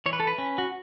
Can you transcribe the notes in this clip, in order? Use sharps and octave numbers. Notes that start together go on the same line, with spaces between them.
E3 C#5
B4
A4
B4
C#4
F#4